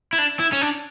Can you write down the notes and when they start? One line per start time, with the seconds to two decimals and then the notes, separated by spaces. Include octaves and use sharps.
0.13 E4
0.18 D4
0.39 E4
0.53 C#4
0.62 D4